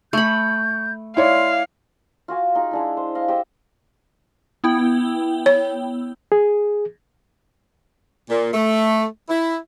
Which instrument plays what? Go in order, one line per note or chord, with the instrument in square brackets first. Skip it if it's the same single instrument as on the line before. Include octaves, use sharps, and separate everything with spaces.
[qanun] A3 B5 [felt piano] C#6 [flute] G6
[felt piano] E4 C#5 D5 [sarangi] F5 [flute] C6
[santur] F4 F#4 G#5 D6
D#4 F4 G#4
G#3 D4 E4
C5
D#5 F5
G4 C5 D#5 E6
[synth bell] B3 E4 G5
[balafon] C#5
[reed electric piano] G#4
[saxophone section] A#2
A3
E4